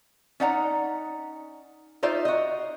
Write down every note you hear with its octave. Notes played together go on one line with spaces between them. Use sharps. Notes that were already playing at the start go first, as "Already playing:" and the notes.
C#4 D#4 D5 F#5 A5 A#5
D#4 F4 C5 D5 E5
F#4 D#5